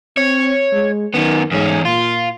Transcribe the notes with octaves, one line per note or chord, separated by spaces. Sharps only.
C4 C#5
G#3
F#2 D#3 B3
E2 G#2 C#4
A#2 F4